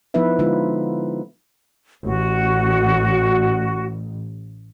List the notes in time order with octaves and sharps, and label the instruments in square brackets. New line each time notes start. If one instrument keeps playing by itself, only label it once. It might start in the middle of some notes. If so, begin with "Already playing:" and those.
[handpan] F3 B3 D#4 E4 B4 E5
D3 G#3 D#4 F4
[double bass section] A1 [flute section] F#4